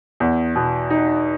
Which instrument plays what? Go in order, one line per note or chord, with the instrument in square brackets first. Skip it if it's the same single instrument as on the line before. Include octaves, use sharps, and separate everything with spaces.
[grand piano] E2
B2
D#4